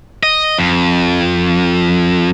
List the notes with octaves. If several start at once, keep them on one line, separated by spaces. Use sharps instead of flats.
D#5
F2